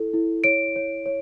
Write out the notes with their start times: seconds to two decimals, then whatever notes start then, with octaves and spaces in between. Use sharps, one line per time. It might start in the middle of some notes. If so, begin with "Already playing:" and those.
Already playing: E4 A4
0.14 E4
0.44 C#5 D7
0.76 C#5
1.06 C#5